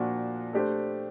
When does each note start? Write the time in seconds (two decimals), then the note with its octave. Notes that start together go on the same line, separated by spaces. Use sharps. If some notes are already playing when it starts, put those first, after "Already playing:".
Already playing: A#2 F3 A#3 D4 F#4
0.53 A3 D4 G4 C5